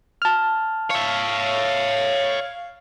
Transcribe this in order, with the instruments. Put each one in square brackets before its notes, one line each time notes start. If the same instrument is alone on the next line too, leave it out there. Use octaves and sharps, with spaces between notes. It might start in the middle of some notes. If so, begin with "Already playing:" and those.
[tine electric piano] A5 F6
[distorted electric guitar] C#5 E5 [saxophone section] F5